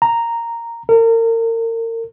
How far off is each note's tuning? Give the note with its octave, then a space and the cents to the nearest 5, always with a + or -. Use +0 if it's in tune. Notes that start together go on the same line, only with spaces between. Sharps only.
A#5 -5
A#4 -35